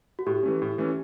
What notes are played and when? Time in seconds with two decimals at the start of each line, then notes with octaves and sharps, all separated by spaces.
0.19 F#4
0.26 A2 G4
0.43 E3 A3 C#4
0.62 A2
0.78 E3 A3 C#4